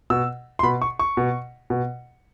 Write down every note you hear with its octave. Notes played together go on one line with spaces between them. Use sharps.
B2 E6
C6
B2 B5
C#6
C#6
B2
B2